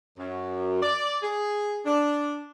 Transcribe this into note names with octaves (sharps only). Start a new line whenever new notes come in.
F#2
D5
G#4
D4